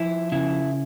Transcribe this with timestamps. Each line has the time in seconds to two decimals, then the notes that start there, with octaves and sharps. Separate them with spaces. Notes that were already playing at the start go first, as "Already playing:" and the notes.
Already playing: F3 E4
0.32 C#3 E4